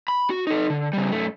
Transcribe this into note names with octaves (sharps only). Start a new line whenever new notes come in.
B5
F#4
D#4 A4
D3
C#3 G3
F#2 A3